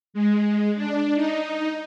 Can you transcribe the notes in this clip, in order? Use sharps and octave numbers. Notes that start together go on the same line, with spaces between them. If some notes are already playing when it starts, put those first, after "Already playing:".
G#3
D4
D#4